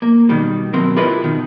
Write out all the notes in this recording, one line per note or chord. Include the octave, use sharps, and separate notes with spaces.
A#3
B2 D#3 G3
B2 F#3 C4 A#4
E4 F4 G4 A#4 B4 D#5
B2 D#3